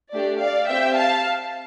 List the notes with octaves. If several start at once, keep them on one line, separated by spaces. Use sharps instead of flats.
A3 D4 G4 D5
D5 F5
C4 G4 E5 G5
F5 A5